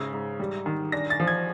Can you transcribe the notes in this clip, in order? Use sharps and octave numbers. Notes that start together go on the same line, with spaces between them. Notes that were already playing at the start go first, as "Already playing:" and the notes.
Already playing: G#2 C#3 E6
G#2
G3
D#3
D4 A#6
A6
F3
G#6